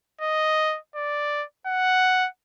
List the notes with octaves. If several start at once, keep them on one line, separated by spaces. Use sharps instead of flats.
D#5
D5
F#5